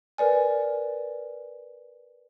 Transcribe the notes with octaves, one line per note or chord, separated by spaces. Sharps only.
A#4 B4 D5 G#5